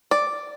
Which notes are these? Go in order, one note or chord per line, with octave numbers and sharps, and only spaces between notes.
D5